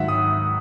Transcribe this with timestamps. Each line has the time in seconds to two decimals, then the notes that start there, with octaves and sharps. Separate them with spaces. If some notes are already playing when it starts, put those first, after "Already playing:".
Already playing: G#2 D#3 F#3 E5 F#5
0.08 D#6